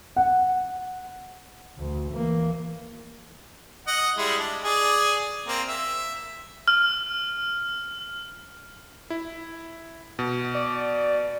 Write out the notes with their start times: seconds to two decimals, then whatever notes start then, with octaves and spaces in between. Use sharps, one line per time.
0.16 F#5
1.78 D2
2.13 E3 A#3
3.87 D#5 F#5
4.17 G3 G#3 E4
4.38 D4
4.64 G#4 D5
5.47 A#3 C4
5.68 E5
6.68 F6
9.10 E4
10.19 B2
10.55 D5